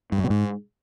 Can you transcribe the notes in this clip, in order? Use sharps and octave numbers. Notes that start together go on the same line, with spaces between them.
G2
F#2
B2
G#2